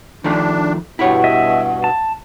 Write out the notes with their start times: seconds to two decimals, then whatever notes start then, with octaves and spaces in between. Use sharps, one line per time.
0.24 D#3 F3 A3 D4
0.99 G2 B2 E4 G4 C#5 F#5
1.24 D#5 E5
1.84 A5